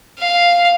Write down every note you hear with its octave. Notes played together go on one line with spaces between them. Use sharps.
F5